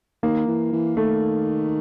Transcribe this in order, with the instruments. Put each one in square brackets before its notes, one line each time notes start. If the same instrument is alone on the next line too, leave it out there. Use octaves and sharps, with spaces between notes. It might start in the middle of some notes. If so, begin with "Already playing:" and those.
[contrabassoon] D#3 [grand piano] A#3
[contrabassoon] E3
E3
[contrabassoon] D#3 [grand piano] A3